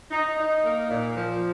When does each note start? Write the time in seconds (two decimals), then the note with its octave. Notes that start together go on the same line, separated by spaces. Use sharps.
0.11 D#4
0.37 D#4
0.63 A#3
0.89 A#2
1.15 F3